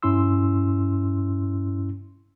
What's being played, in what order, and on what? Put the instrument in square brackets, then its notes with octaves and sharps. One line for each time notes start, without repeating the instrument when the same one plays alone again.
[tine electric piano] G2 C#4 E4 C6 E6